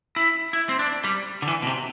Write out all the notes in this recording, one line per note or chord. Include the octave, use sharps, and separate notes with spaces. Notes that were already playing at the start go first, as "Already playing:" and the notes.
E4
E4
C4
D4
G3
D3
E3
B2
C3